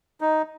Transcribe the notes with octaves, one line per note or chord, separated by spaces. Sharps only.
D#4